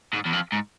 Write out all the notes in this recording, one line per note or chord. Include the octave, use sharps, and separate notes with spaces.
G#2
E2
F2
G#2